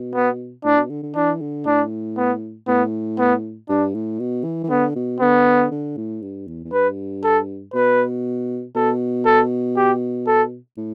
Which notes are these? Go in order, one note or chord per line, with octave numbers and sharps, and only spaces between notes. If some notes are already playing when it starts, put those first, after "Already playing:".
Already playing: B2
B3
A2 D4
B2
D3
D3
E3 D4
D3
A2 D4
B3
A2 B3
B3
G2 D4
A2
B2
E3
E3
D3 B3
B2
D3 B3
D3
A2
G2
E2
E2
G2 B4
A4
B2 B4
B2 A4
A4
G4
A4
A2